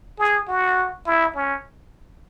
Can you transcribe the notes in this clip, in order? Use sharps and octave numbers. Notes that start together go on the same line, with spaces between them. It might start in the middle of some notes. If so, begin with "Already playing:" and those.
G#4
F#4
E4
C#4